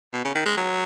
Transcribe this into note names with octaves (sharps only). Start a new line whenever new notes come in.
B2
C#3
D#3
G#3
F#3